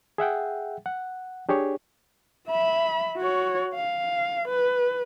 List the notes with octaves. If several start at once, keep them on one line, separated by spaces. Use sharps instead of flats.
G#4 E5 F#5 G5
F#5
D4 G4 G#4 C#5
E5 B5
F#4 C#5
F5
B4